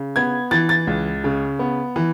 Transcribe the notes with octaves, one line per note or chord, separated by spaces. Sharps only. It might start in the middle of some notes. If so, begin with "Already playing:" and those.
Already playing: C#3
B3 G#6
E3 A6
A6
C#2
C#3
B3
E3